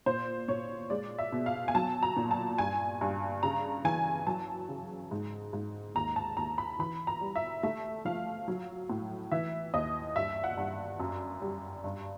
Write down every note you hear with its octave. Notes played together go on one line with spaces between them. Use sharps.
A#2 C5
A#2 C#5
G#3 D5
E5
B2
F5
G#5
F#3 A5
A#5
A#2
A5
G2 G#5
G2
C#3 A#5
E3 G#5
F#3 A5
C#3
G#2
G#2
D#2 A#5
A5
D#2 A#5
B5
E3 B5
A#5
G3
E5
A3 E5
F3 F5
F#3
A2
E3 E5
D#2 D#5
G2 E5
F#5
G2
F#2
G3
G2